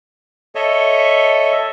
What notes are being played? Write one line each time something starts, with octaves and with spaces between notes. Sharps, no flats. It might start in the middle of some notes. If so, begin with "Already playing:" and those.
A4 C#5 D#5 E5